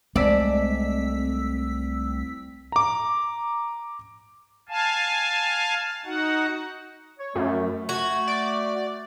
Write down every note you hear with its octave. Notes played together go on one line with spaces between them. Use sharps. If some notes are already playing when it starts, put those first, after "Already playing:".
C2 G#3 A3 C4 D5 E6 B6
A#5 D6
F5 G#5 A5
D#4 F#4 F#5
C#5
F#2 A3
F#4 G#6
D5